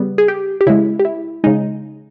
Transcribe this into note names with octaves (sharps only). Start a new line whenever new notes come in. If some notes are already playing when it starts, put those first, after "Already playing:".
Already playing: C#3 G3 B3
G#4
G4
G4
C#3 G#3 E4
G4
E4
C#3 G#3 D#4